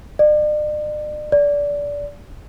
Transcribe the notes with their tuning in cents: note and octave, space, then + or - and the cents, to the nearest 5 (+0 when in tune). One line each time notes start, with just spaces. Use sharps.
D5 +40
D5 -20